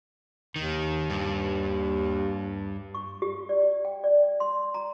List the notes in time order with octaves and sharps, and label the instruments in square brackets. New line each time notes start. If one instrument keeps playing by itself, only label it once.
[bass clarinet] D#2 [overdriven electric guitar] D#3
[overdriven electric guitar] G2
[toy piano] C#6
G4
D5
G5
D5
C6
A#5